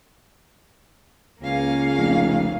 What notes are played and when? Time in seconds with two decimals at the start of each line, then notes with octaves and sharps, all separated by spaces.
1.41 C#2 A#3 C#4 F5
1.97 F1